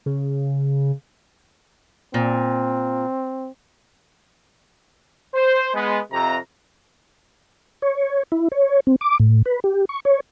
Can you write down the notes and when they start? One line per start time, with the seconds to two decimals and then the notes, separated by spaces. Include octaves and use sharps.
0.06 C#3
2.14 A#2 C4
5.35 C5
5.74 G#3 B3
6.13 F2 C3 A#5
7.82 C#5
8.32 E4
8.52 C#5
8.87 C4
9.01 D6
9.20 A2
9.46 B4
9.64 G4
9.89 C#6
10.05 C#5